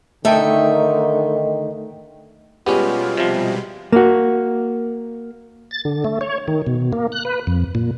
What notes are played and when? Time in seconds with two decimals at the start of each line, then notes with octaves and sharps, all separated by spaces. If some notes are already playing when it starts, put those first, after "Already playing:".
0.25 D3 D#3 A3 D#4 A4 E5 G5
2.66 B2 G3 G#3 B3 C#4 F4 G4
3.17 C3 F3
3.92 A#3 F#4
5.71 A6
5.85 D3
6.05 A3
6.21 C#5
6.48 D#3
6.67 B2
6.93 A#3
7.12 F#6
7.25 B4
7.47 F2
7.75 A#2